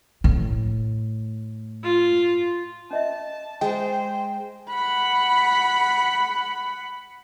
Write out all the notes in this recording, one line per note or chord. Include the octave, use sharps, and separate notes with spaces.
A2
F4
C#4 D#5 E5 A5
G#3 C5 G5
F#5 B5